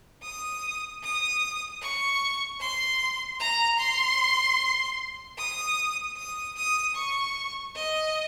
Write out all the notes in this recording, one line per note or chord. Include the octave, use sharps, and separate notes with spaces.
D#6
D#6
C#6
C6
A#5
C6
D#6
D#6
D#6
C#6
D#5